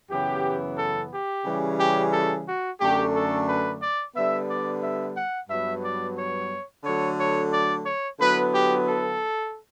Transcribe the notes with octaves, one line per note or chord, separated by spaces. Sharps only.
F#2 C#3 E3 B3 G4
A4
G4
C#3 E3 G3 C#4
G4
A4
F#4
F#2 D3 A3 D4 G4
A4
B4
D5
D3 G3 B3 E5
D5
E5
F#5
G2 F#3 B3 E5
D5
C#5
D3 F#3 A3 C#5
C#5
D5
C#5
D3 F#3 B3 E4 B4
G4
A4